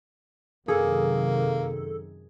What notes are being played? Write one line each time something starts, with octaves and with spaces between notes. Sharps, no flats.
F#2 C3 D#3 A#3 G#4 A4